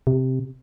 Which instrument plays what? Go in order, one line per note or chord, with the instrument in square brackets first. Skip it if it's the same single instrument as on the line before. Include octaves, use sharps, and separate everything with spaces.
[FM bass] C3